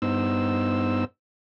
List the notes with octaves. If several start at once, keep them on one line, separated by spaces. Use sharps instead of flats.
G2 B3 D#4 C5 E6